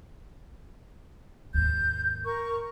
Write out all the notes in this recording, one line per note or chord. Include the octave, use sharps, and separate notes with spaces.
D#2 G#2 G6
A#4 C#6